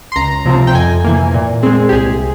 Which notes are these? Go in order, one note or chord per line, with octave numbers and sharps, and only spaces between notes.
C6
C#2 A#5
C3 F3 C4
G5
F2 G#5
C3 E3 A#3
A#2
G#3 C4 G#4
G4
C2 G#4